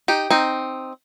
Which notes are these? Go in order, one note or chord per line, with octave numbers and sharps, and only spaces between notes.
D#4 G4
C4 D#4